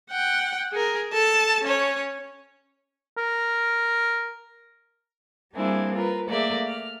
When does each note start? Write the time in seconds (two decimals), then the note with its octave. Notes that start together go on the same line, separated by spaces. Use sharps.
0.10 F#5 G5
0.72 G#4 A#4
1.13 A4 A5
1.64 C#4 C#5
3.17 A#4
5.53 G3 A#3 C4 D4 E4 G#4
5.94 F4 A#4 B4
6.28 A3 A#3 G#4 D5 E5
6.68 F6